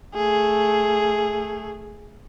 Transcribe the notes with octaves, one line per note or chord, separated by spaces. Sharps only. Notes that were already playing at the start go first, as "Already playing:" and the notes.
A3 G#4